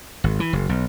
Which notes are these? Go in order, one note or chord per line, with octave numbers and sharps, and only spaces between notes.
G#1
E3
F#1
B1